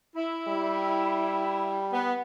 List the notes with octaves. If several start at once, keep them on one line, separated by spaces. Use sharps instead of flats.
E4
G3
B3